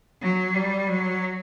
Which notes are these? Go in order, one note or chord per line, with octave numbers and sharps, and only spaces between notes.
F#3
G3
F#3